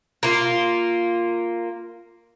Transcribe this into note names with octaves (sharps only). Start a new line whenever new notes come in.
A#3 F4